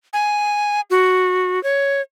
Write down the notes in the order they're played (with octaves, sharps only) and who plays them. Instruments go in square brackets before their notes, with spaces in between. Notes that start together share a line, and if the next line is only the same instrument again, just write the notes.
[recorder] G#5
F#4
C#5